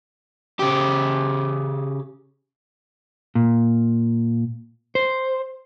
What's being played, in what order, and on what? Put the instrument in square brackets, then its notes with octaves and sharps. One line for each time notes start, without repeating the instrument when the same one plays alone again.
[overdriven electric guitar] C#3 G4
[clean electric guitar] A#2
C5